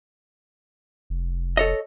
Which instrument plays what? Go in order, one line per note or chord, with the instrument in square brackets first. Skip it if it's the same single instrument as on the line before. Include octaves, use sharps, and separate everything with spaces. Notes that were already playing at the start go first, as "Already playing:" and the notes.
[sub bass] F1
[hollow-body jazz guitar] A4 C#5 D#5